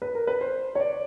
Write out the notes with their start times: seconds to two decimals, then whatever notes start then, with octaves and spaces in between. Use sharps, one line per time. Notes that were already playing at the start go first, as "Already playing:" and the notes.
0.02 B4
0.15 A#4
0.27 B4
0.41 C5
0.75 C#5
0.80 D5